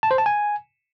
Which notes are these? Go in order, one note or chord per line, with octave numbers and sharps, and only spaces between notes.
A5
C5
A5
G#5